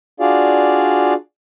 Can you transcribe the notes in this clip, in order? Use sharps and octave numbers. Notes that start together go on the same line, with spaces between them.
D4 F4 F#4 G#4 D5 F5